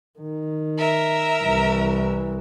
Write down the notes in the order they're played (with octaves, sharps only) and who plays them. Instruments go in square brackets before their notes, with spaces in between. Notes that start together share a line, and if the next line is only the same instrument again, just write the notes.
[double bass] D#3
[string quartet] A#4 E5
[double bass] C2 E3